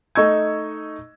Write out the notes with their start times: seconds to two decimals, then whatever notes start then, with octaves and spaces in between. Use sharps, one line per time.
0.15 A3 D#4 D#5 C#6 E6 G#6